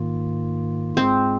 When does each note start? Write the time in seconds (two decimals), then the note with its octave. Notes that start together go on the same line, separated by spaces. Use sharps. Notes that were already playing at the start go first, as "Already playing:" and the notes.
Already playing: G#2 D#3 A#3 F4
0.97 G#2 G#3 C4 F4 G#4